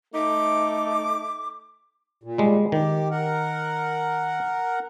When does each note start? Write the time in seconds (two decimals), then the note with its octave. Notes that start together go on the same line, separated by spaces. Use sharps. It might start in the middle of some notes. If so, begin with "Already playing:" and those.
0.14 A3 D#4 D6
2.23 A#2
2.38 G3 G#3
2.72 D#3 G4
3.11 A#4 F#5